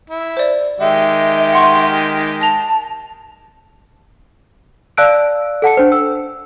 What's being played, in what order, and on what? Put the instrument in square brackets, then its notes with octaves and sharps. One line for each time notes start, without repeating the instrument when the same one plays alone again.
[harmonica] E4
[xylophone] C5 D5
[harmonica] D#3 G#3 G4 [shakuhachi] E5
[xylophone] F#5 C6 C#6
[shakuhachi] A5 [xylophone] A#6 F7
[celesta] D5 F5 A5 E6 F#6 D7
A4 F#5 A5 C#7
D4 C5
E6